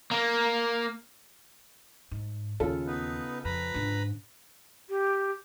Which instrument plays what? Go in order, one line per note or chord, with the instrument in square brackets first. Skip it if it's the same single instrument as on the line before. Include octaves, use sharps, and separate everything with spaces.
[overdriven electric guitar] A#3
[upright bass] G#2
[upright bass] D#2 [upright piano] C#3 F4 A4
[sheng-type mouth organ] B3 D#4 B4
[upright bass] F2 [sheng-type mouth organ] B4 A#5 B5
[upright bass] G#2 D3
[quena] G4